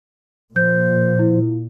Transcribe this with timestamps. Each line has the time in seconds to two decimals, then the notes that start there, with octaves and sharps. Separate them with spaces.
0.56 A#2 F3 C5 G6
1.19 E4